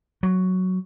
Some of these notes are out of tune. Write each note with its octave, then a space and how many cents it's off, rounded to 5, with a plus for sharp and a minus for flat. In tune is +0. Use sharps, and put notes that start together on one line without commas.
F#3 +0